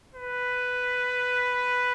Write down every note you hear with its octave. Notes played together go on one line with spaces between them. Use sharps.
B4